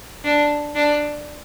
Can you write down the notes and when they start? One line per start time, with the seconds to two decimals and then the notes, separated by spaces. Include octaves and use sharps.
0.25 D4
0.75 D4